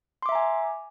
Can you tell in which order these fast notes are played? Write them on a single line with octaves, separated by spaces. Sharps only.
C6 D6 E5 A#5 G#5